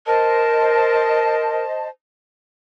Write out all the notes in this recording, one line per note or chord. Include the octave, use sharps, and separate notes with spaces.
A#4 C5 D#5 A5